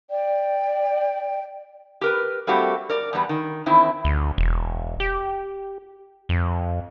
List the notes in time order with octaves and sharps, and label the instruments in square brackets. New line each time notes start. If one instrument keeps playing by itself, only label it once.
[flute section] D5 G5
[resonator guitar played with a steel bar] G4 A#4 B4
G3 A3 A#3 C4 F#4 G4
A#4 D5
E2 G#2 G3 B3
D#3
E2 D#3 C4 E4
[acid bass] D2
E1
G4
F2